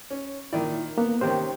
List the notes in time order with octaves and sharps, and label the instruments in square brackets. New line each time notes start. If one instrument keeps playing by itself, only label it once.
[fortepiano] C#4
[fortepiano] A#2 D#3 D5 [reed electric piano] E4
[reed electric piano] A#3 [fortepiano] B3
[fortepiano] C3 D#3 C#4 [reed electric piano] C5 G5